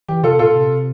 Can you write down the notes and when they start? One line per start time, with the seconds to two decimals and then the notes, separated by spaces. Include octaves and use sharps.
0.08 E3 G4
0.23 C3 F4 A4
0.39 A#2 F4 A4
0.55 C3